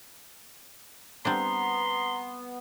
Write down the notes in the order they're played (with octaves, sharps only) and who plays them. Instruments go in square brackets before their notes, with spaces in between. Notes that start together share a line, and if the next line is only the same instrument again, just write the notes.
[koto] G3 C4 D4 [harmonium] B3 [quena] A#5 [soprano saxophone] C6